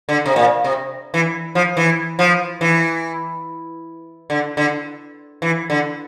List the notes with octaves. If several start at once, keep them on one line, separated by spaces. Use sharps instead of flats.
D3
C3
A#2
C3
E3
F3
E3
F3
E3
D3
D3
E3
D3